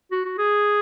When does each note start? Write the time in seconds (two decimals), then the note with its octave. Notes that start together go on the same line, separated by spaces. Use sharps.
0.11 F#4
0.25 F#4
0.38 G#4